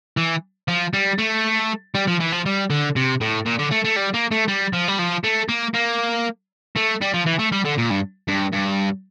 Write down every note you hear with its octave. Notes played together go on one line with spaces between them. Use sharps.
E3
F3
G3
A3
G3
F3
E3
F3
G3
D3
C3
A2
A#2
D3
A3
A3
G3
A#3
A3
G3
F3
G3
F3
A3
A#3
A#3
A3
G3
F3
E3
A3
G3
D3
A#2
G2
G2
G2